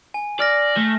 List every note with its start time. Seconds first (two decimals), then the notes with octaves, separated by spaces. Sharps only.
0.14 G#5
0.40 D5 F6 A#6
0.77 A3